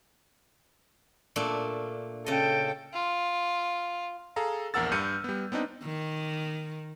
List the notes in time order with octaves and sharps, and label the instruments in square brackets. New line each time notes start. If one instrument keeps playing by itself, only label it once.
[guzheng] A#2 A3 D4
[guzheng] C#3 D#5 [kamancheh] A4 G5
[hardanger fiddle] F4
[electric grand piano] G#4 A4 F5 A#5
A#1 E2 A#4 F#5 E6 A6
G2 F6 G6 C#7 D#7
G3 B3
B3 C4 D4 D#4
[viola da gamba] D#3